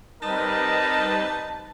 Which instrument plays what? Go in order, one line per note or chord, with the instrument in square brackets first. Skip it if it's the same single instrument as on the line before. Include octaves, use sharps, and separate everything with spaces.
[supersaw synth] G3 C4 B4 [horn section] D#4 D#5 [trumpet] A#4 [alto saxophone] A5